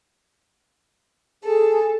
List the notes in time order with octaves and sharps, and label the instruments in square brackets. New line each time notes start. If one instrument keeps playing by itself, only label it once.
[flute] G#4 [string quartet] A4